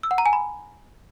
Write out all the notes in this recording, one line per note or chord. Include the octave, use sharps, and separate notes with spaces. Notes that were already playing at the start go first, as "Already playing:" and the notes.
E6
F#5
A#5
G#5
B5